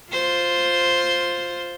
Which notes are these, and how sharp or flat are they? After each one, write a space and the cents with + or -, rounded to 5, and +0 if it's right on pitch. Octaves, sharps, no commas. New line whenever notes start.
F4 +5 C5 +0